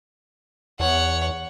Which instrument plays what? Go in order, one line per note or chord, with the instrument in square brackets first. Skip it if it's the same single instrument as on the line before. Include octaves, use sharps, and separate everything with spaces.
[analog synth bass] E2 [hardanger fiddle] C#5 F#5